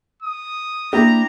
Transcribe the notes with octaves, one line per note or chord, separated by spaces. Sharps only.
D#6
A#3 D4 E4 G4 A#5